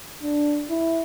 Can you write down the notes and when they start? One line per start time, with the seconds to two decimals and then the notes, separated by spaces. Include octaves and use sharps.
0.22 D4
0.70 E4